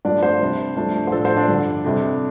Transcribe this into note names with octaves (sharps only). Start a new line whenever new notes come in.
G2 F3 A3 D4 D5
C5
C3 G3 D4
G2 F3 A3 D4
C5
A2 F3 A3 D4 A4
C5
D4 D5
G2 D3 F3
F2 C3 G3